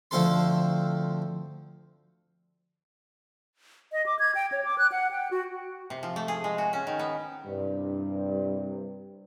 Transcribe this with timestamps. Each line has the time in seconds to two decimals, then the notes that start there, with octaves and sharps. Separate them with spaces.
0.11 D2 F3 C4 A4 A5 C6
3.92 D#5
4.06 D6
4.19 G#6
4.35 G5
4.52 C#5
4.65 D6
4.78 F#6
4.92 F#5
5.11 G5
5.31 F#4
5.90 C3
6.03 F3
6.16 A3
6.28 G#4
6.44 G#3
6.58 F#4
6.73 C#4
6.87 D#3
6.99 B3
7.45 C2 G2 C3